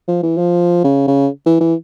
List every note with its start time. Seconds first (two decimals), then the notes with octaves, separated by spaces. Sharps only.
0.08 F3
0.23 E3
0.38 F3
0.84 C#3
1.08 C#3
1.46 E3
1.61 E3